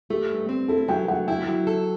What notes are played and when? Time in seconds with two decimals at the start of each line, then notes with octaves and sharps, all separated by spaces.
0.10 A3 G4
0.30 G2
0.49 C4
0.68 E4 A4
0.88 F#3 G5
1.08 F#3 F#5
1.27 E4 G5
1.47 F#3
1.67 A4